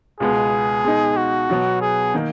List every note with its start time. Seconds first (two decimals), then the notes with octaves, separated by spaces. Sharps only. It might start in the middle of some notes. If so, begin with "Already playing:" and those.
0.20 C#2 B2 G#3 B3 G#4
0.84 B2 G#3 D#4
1.17 F#4
1.49 B2 F#3 B3
1.81 G#4
2.14 D#3 A#3 D#4